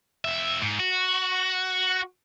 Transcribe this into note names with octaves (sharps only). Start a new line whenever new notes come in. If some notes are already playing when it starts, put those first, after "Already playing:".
F2 E5
G#2
F#4